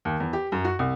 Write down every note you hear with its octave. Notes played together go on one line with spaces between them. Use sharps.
D#2
E2
G4
F#2
F#4
C2